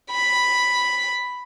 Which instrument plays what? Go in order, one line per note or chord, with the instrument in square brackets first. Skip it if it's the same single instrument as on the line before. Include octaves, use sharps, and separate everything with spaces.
[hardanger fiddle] B5